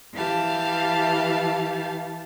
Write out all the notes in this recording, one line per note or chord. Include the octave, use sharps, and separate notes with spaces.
E3 G4 F5 A5